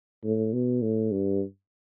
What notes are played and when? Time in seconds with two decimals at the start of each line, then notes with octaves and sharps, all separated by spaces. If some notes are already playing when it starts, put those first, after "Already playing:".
0.24 A2
0.53 B2
0.82 A2
1.11 G2